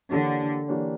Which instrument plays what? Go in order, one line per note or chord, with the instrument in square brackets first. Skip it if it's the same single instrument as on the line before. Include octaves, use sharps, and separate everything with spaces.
[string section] D3 [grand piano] E3 A#3 D4 G4 C#5
[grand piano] E3 A#3 D4 G4 C#5